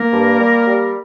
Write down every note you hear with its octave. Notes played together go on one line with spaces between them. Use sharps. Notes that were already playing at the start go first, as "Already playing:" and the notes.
Already playing: A#3 A#4
G2
G3
G3